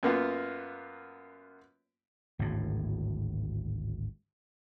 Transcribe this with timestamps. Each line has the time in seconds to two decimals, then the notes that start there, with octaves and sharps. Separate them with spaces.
0.03 F#2 A#3 B3 F4
2.39 G#1 D2 A2